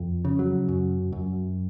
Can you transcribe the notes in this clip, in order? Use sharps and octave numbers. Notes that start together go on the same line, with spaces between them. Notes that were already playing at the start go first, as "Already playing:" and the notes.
Already playing: F2
C#3
F#3
F#2
F#2